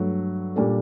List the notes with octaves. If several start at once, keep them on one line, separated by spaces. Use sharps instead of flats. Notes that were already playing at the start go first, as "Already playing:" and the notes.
Already playing: G2 F#3 A3
A#2 G3 D4 A4